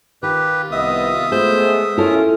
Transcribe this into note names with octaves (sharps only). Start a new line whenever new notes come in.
D#3 F4 G4 B4
C2 B3 D#5 E5 D#6
G#3 A3 B3 G#4 C5
C#4 E4 F4 A4 A#4